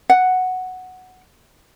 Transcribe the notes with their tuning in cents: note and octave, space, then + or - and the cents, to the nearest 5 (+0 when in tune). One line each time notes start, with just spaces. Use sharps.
F#5 +0